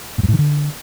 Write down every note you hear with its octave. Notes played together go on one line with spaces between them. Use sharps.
A2
F#2
A2
D#3
D3